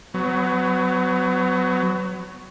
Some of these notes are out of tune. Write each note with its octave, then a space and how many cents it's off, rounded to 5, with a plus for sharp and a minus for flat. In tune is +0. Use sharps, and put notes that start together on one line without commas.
F#3 +0 B3 +35